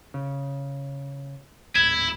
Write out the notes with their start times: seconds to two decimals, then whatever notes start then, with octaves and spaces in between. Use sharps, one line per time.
0.14 C#3
1.75 D1 G#1 E4 G#6